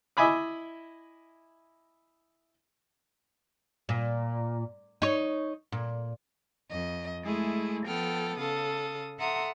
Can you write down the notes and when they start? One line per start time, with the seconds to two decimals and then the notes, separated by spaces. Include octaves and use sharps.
0.17 E4 D#5 E5 G#5 B5 D6
3.89 A#2
5.02 D#4 C#5
5.72 A#2
6.70 F2 D#5
7.22 G#3 A3 E4 G#4
7.86 F3 B3 A4 G5 F6
8.38 C#3 A4 F5 D#6
9.18 A4 E5 F#5 A#5 C6 D#6